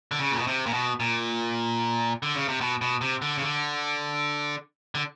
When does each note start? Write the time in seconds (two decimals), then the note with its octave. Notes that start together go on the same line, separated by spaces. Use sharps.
0.12 D3
0.20 C#3
0.31 A#2
0.38 B2
0.47 C3
0.66 A#2
0.73 B2
1.00 A#2
2.23 D3
2.35 C#3
2.48 C3
2.61 B2
2.81 B2
3.01 C3
3.22 D3
3.38 C#3
3.42 D3
4.95 D3